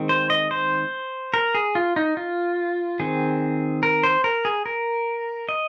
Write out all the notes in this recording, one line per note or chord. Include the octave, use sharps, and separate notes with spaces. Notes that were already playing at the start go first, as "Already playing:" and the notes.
Already playing: D#3 G#3 C4
C5
D#5
C5
A#4
G#4
F4
D#4
F4
D#3 C4 G#4
A#4
C5
A#4
G#4
A#4
D#5